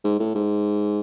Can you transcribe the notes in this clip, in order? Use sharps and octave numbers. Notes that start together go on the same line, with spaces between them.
G#2
A2
G#2